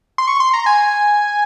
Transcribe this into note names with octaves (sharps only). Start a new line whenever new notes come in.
C6
C#6
C6
A#5
G#5